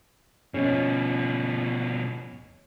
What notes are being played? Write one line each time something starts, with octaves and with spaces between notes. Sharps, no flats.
B2 F3 C#4 D#5